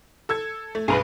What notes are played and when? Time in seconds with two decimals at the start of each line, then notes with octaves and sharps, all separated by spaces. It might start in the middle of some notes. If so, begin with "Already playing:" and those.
0.29 A4 E6 G#6
0.75 A3
0.88 B1 G2 G#4 A#4 B4